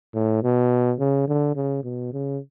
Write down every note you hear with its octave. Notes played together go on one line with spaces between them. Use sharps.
A2
B2
C#3
D3
C#3
B2
C#3